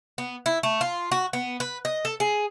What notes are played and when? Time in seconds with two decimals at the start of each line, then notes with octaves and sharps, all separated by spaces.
0.18 B3
0.46 E4
0.63 A3
0.81 F4
1.12 F#4
1.33 B3
1.60 B4
1.85 D#5
2.05 A4
2.20 G#4